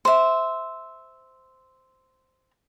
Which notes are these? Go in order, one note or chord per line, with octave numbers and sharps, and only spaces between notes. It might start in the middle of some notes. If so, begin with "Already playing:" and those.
C5 E5